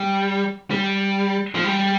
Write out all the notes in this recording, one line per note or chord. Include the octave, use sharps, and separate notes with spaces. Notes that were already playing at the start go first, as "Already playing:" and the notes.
Already playing: G3
G3
F3
G3